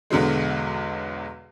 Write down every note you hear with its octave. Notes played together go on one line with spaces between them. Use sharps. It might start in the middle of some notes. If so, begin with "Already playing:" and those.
B1 E2 D3 F#3 G#3